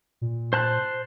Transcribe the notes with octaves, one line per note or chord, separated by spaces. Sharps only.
A#2
C5 A5 F#6